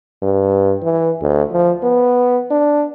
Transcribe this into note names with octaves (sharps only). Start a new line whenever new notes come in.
G2
E3
D2
F3
B3
D4